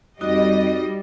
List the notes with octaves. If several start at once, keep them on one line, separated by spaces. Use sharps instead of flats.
F2 G3 D#4 F#4 D#5